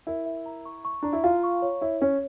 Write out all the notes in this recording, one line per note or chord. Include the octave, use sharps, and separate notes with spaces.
E4 A#4
E5
A#5
C#6
C#6
D4 A#5
E4
F4 F5
C#6
C#5
E4 C#5
C#4 C#5